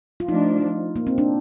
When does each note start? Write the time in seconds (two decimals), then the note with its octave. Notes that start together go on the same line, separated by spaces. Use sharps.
0.20 F4
0.29 F3 A3 D4 D#4
0.96 A#3
1.07 C4
1.18 D4